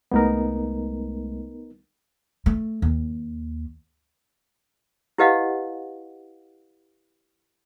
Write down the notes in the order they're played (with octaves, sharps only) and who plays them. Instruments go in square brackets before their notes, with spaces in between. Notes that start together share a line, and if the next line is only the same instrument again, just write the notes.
[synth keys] C2 G#3 A3 [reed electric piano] B3 D#4 A#4
[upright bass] A3
D#2
[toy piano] E4 G4 B4 D#5 F5 F#5